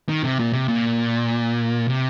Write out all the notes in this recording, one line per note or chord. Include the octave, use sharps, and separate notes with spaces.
D#3
C3
A#2
C3
A#2
C3